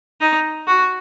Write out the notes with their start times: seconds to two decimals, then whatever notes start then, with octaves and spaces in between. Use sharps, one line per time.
0.21 D#4
0.67 F#4